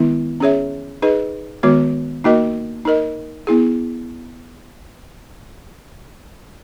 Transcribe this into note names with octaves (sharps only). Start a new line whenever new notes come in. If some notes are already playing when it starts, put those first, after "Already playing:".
Already playing: D#3 G#3 B3 E4
C#4 G#4 C#5 E5
D#4 G#4 B4 D#5
D#3 G#3 B3 F#4 C#5
A#3 D#4 F#4 A#4 D#5
D#4 A#4 D#5
B3 E4 G#4